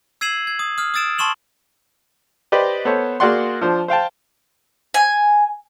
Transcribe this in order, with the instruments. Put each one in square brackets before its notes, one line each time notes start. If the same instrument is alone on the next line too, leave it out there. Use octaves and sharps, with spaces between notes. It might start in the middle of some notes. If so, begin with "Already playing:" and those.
[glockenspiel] E6 G#6 C7 D#7 E7 F#7
G#6
D#6
D#6 F6
D#6 E6 A6 D7 E7
A5 C6 C#6 E7 F#7
[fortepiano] G4 B4 C5 D5 D#5
B3 A4 C5 C#5
A#3 F#4 G#4 D5 F#5 C6
F3 D4 C5
C5 F5 G5 A5
[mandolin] G#5